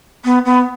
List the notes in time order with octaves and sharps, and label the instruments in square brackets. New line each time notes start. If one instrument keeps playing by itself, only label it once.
[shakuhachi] B3
B3